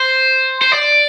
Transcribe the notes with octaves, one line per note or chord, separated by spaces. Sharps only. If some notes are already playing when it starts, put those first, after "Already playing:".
Already playing: C5
C5
D5